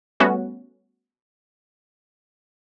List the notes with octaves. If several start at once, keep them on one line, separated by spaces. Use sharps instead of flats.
G3 A3 B3 C#4 F#4